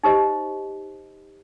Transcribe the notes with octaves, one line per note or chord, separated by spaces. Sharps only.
D#4 G4 C5 D#5